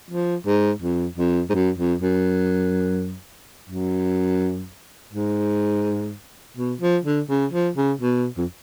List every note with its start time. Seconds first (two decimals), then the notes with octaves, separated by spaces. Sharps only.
0.11 F3
0.46 G#2
0.82 F2
1.18 F2
1.50 G#2
1.54 F#2
1.78 F2
2.02 F#2
3.70 F#2
5.13 G#2
6.57 B2
6.81 F3
7.05 D3
7.29 C#3
7.53 F3
7.76 C#3
8.01 B2
8.37 F2